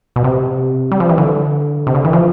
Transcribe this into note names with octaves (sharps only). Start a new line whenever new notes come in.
B2
C3
G3
F3
E3
D3
C3
D3
E3
F3